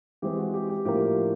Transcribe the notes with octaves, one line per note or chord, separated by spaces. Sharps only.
E3 G#3 C4 G4
F#4
G4
G4
A2 F3 A#3 D4 G4